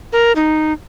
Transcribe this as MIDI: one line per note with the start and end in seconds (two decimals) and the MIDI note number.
0.13 0.32 70
0.36 0.73 63